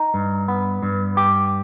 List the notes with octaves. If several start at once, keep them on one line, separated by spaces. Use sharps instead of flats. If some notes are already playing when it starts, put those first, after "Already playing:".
Already playing: D#4
G2
B3
G2
G4